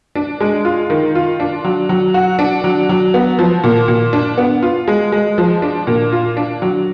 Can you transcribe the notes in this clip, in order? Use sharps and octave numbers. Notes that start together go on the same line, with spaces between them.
D4
G#3
F4
D#3
F4
D4
F#3
F#3
F#4
D4
F#3
F#3
B3
F3
A#2
A#2
D4
B3
F4
G#3
G#3
F3
D4
A#2
F4
D4
F#3